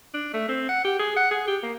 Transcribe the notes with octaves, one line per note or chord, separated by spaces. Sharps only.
D4
A3
C4
F#5
G4
G#4
F#5
G#4
G4
A#3